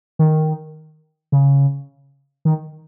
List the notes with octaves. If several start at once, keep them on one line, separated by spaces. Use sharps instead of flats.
D#3
C#3
D#3